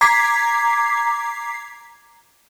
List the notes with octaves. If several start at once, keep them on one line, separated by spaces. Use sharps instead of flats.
A#5 D6 G#6 B6 C7